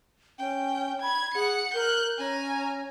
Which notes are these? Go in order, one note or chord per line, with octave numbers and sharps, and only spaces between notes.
C#4 G5
B5 G#6
G#4 F#5 C#7
A#4 F#6 G6
C#4 G#5 A#5